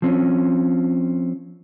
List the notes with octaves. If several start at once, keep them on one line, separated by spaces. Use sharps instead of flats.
F3 C4 C#4